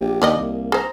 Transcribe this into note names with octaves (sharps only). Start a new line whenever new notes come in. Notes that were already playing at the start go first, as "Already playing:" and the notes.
A#1 G4
D#2 A#3 G4 D5 D#5
C2
G#4 C5 A#5